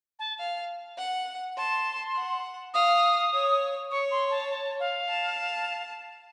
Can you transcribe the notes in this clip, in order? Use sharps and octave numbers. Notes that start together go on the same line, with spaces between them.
A5
F5
F#5
A5 C6
F#5
F5 D#6
C#5
C#5 C#6
C6
A5
A5
F5
A5